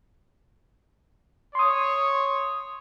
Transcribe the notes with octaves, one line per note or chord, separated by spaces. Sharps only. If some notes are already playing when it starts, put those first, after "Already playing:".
C#5 C6 D#6